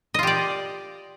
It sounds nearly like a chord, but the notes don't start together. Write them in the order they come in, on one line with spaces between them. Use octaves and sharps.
D#5 F4 G4 D5